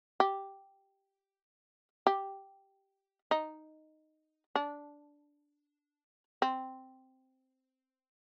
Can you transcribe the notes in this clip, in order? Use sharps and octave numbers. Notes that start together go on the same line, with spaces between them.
G4
G4
D#4
D4
C4